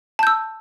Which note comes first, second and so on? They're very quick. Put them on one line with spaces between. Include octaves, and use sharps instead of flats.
A5 G6 E6